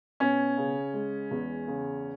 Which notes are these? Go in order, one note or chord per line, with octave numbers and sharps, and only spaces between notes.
B2 C#4
C#3
G#3
E2
C#3